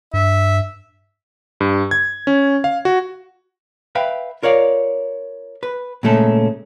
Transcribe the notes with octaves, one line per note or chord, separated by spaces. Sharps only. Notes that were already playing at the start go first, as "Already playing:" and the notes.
G2 E5
G2
G#6
C#4
F5
F#4
B4 E5 F5 G5 B5
F4 A#4 C#5 D5 F5
B4
A#2 C#3 G#3 A3 C#4 A4